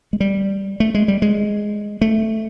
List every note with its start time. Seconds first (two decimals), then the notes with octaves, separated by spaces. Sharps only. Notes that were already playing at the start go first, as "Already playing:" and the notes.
0.13 G#3
0.20 G3
0.80 A3
0.94 G#3
1.08 G3
1.22 G#3
2.01 A3